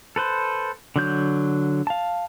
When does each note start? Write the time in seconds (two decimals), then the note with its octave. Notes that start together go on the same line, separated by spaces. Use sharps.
0.16 A4 B4 C5
0.96 D3 F#3 G6
1.87 F5 A5